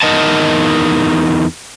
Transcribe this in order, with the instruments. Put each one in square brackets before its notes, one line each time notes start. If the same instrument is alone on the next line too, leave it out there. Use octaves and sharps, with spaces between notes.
[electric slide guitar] E2 D#4 A#4 D#5 F#5 A5